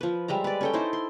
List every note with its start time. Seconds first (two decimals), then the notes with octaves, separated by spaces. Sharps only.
0.01 F3 B4
0.28 G3 G#3 E5 A#5
0.44 B4 D5
0.61 C#4 A4 G5
0.73 D#4 E4 C5
0.93 C6